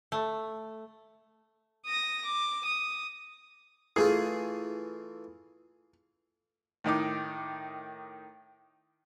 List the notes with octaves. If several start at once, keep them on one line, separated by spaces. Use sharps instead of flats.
A3
D#6 A#6
D6
D#6
E3 A3 F4 G#4
A2 D#3 D#4 D6